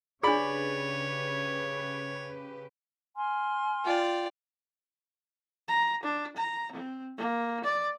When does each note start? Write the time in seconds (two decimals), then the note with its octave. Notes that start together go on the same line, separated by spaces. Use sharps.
0.23 C#3 D4 G4 G#4 B4 C#5 D5 B5
3.16 G#5 C6 F6
3.84 F4 D5 G5
5.68 A#5
6.03 D4
6.37 A#5
6.72 C4
7.18 A#3
7.64 D5